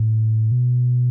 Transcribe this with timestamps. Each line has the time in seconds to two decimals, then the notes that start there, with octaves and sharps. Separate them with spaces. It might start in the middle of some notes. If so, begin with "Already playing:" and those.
Already playing: A2
0.51 B2